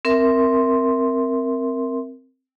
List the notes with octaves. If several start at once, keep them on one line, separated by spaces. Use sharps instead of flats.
C4 A#4 E5 C6